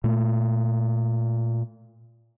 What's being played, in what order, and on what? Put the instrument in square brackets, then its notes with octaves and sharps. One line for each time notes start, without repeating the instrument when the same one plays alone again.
[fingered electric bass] A#2 A3